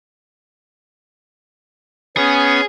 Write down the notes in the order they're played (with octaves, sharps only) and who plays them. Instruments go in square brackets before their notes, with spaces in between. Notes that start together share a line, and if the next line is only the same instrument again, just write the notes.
[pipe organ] B3 C#4 [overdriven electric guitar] G#4